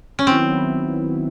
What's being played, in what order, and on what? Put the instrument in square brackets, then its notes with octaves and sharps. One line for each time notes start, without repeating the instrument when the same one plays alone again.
[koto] C#4
[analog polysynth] D#3 F#3 B3 E4 [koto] C4